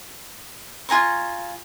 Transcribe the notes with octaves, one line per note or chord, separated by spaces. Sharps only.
F4 G#5 A#5 C#6